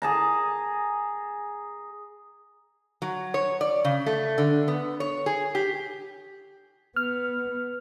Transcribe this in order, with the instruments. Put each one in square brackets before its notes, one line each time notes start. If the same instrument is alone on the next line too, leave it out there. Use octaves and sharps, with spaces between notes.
[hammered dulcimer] G#4 A5 A#5
[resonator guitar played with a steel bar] F#3
C#5
D5
C#3
A3
D3
B3
C#5
G#4
G4
[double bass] B3 [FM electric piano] F6